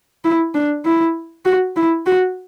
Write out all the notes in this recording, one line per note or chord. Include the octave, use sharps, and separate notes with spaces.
E4
D4
E4
F#4
E4
F#4